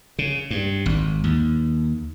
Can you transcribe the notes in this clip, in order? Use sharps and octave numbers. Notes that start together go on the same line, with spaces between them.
C#3
G2
G#1
D#2